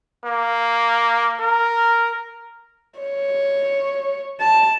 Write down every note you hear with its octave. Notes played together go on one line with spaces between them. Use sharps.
A#3
A#4
C#5
A5